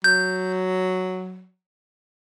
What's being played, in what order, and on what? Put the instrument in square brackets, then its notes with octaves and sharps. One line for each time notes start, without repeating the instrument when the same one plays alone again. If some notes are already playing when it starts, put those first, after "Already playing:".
[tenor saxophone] F#3 [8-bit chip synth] G6